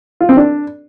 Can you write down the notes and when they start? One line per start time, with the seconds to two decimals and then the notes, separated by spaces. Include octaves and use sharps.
0.20 F4
0.29 C4
0.37 D4